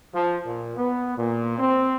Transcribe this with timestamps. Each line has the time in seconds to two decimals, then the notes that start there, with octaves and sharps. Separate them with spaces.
0.13 F3
0.45 A#2
0.77 B3
1.18 A#2
1.58 C4